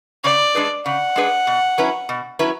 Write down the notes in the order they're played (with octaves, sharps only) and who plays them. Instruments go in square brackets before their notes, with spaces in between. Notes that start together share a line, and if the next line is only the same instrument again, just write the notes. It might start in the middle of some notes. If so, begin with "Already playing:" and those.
[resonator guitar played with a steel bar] C#3 [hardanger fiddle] D5
[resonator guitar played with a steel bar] G#3 D4 G#4 B4
[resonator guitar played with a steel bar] C#3 [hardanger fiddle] F#5
[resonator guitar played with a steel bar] G#3 D4 G#4 B4
B2
F#3 C#4 E4 B4
B2
F#3 C#4 E4 B4